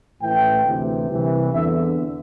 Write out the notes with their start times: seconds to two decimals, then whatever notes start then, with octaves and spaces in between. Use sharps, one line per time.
0.21 A1 A2 E3 G5
0.64 D2 C3 E3
1.08 C2 C3 E3
1.51 E2 D3 E5